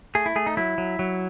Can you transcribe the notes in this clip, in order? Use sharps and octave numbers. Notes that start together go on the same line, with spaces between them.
A3 G#4
E4
A3 G#4
D#4
F#3 E4
F#3
F#3